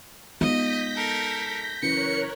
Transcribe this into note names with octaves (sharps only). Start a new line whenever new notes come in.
G#3 B3 D#4 F4 D#5 G6 A#6 B6
A4 A#4
F#2 C#3 E3 A#4 C#5 F#6 C#7